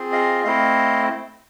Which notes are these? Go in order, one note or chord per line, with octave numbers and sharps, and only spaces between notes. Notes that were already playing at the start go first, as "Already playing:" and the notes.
Already playing: C4 F4 G#4
D#5 F5
A3 C4 E4 D#5 F5